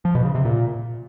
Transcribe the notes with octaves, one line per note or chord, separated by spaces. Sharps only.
F3
B2
C#3
C3
A#2